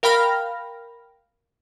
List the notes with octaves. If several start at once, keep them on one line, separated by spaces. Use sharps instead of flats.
A#4 F5 G5 B5 F6 A#6